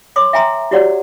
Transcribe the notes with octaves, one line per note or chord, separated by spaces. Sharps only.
C#5 C6 D6 D#6
E5 G5 G#5 A#5 C6 E6
E4 F#4 G4 C#5 D5 F#5